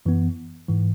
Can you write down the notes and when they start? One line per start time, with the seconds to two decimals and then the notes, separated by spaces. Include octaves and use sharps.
0.06 F#2 E3 B3
0.69 G#2 E3